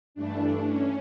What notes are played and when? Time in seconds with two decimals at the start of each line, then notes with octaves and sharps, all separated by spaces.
0.15 G2 E3 A3 D4
0.64 C#4